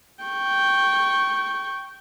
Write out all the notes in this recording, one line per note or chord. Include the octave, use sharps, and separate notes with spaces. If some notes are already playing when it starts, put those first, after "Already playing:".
G5 C#6